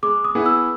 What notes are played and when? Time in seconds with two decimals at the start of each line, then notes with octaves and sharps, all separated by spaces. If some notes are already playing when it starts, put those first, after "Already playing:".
0.03 G#3 D6
0.24 D#6
0.35 B3 E4 G#4
0.46 E6